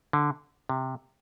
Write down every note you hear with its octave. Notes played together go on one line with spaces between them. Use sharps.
D3
C3